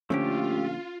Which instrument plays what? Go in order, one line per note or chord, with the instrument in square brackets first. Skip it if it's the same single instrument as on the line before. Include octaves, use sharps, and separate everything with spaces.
[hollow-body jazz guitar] A#2 D3 F3 [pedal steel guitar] A3 G4 [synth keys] C#4 [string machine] F4